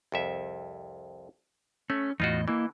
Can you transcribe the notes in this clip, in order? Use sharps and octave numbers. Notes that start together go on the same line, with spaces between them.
C2 F2 E5
A3 C#4
E2 A2 D#4 F4 F#4 D#5
E3 A#3 E4 D#5